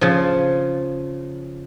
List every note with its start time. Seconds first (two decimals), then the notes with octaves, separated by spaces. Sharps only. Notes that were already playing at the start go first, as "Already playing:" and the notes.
0.01 C#3 F3